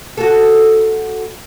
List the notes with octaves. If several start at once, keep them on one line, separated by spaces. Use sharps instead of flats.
F#4 A4